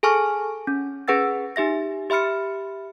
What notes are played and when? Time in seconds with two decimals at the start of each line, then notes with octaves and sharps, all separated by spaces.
0.03 G#4 A4 G#5 A5 C#6 F6
0.67 C#4
1.08 C#4 G#4 B4 F#5 E6 A6
1.56 D#4 G4 E5 A#6
2.10 G4 E5 B5 F6 C#7